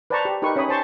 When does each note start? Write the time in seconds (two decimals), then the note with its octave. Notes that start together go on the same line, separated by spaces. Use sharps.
0.10 B4 C5 D5 A5 A#5 C#6
0.25 G4
0.42 D#4 G4 A#4 B4 C#6
0.56 C#4 C#5 E5 B5 D#6
0.69 C5 A5 C6 C#6